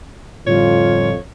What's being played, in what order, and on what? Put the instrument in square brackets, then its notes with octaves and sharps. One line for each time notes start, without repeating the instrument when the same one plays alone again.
[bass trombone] F2 [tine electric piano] A2 D3 G3 [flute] F4 [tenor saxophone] C#5